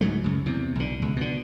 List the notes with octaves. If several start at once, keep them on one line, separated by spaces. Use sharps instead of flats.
C#2 G#2 F#3 A3
C#2 F#2
E2 C3
B1 D3
C#2
B2 D3